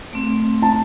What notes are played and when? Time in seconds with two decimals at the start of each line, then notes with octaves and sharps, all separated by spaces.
0.13 A3 C4
0.62 A5